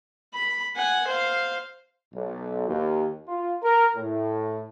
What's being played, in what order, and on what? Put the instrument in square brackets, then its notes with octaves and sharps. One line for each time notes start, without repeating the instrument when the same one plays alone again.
[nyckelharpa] B5
F#5 G#5
C5 F5
[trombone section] B1
D#2
F4
A#4
A2